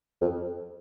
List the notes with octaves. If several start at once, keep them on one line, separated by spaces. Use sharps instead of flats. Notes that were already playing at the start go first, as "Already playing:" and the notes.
F2